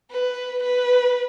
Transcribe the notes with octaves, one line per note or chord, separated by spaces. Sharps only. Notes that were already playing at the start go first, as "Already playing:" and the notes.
B4
B4